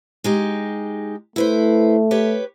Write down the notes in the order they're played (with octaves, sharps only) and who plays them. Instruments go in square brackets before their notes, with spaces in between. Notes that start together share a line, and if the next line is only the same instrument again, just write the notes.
[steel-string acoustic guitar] G#3 D#4 G4
[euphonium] A3 [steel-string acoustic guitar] E4 B4 C5
[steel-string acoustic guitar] G4 B4 C#5